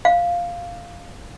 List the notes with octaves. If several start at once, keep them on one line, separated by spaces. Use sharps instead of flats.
F5